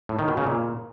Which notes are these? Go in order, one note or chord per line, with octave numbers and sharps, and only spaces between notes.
A2
D#3
B2
C#3
A#2